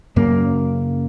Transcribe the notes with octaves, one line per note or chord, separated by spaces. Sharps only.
F#1 F#2 C#3 A#3